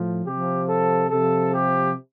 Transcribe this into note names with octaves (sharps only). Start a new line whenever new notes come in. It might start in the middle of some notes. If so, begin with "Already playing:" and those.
Already playing: A2 F3
C3 F3 G4
A4
C3 F3 A4
G4